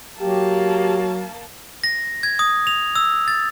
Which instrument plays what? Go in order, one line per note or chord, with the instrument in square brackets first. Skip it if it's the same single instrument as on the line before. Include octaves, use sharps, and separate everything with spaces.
[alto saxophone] F#3 [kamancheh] A#3 A5 [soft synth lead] G4
[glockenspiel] A#6
G#6
D#6
F7
E6
A6